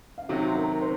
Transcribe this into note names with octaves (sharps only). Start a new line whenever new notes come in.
F5
C3 D#3 F#3 F#4 F#5
C6
A#4 A#5
C5 C6